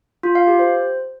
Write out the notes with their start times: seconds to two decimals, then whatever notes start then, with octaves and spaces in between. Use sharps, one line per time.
0.23 F4
0.35 F5
0.47 G4
0.59 C5